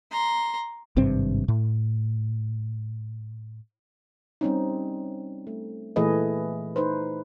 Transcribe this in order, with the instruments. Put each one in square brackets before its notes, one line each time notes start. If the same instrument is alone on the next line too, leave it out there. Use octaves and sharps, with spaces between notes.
[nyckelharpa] A#5 C6
[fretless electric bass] G#1 G2 C3 C4
A2
[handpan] G3 C4 C#4 D#4
A3
A#2 E3 A3 G#4 B4 D#5
D#4 B4 C5